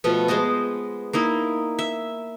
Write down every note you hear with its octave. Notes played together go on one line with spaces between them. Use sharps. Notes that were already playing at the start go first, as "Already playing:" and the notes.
B2 F3 A3 B3
G#3 B3 C5 D#5
A#3 D#4 E4
E5